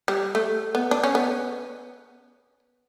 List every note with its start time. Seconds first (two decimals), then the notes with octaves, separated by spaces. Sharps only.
0.08 G3
0.35 A3
0.75 B3
0.91 D4
1.04 C#4
1.15 B3